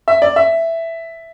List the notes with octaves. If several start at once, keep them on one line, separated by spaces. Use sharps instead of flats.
E5
D5
E5